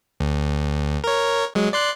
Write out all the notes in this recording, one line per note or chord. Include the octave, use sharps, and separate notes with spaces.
D2
A#4 C#5
F#3 G#3
D5 C6 F#6